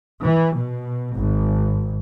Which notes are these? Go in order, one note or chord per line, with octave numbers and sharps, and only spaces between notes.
E3
B2
G#1